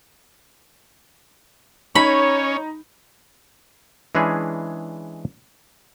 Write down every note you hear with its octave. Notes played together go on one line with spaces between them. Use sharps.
C#4 D#4 C#5 B5
E3 G#3 C#4 D4 G#4 B4